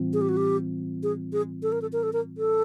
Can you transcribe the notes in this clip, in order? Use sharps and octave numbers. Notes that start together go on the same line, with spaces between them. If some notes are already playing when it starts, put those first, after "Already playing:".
Already playing: A2 E3 G3 C4 F4
G#4
G4
F#4
G4
G#4
G#4
A4
A#4
A4
A#4
A4
A#4
A4